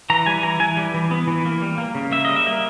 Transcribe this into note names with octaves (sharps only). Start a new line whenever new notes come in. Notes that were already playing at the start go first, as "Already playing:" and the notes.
E3 A#5
G3 G#5
E3 A#5
E3 G#5
G3
E3
B3
E3
A#3
G3
A#3
C#3
A#3 E5
G3 D#5
E5
A#3